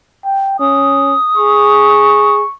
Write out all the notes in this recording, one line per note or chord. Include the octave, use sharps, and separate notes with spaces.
G5
C#4 D#6
G#4 C#6